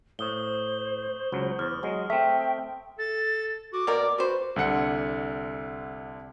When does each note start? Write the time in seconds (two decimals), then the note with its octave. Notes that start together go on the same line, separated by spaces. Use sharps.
0.19 A2 C5 C#6 D#6 G7
1.32 C#2 F#3
1.59 E2 F6
1.83 F#3 G#3 D#5
2.10 A3 C4 E5 G5
2.98 A4 A6
3.73 F#4 D6
3.87 B2 A#3 A#4 D5
4.18 F#4 B4 C5
4.56 C2 D3 F#5 C#7